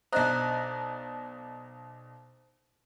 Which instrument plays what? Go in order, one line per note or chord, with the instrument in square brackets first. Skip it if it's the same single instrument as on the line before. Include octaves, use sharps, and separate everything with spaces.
[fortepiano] B1 D4 D#5 [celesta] C5 A#5 F#6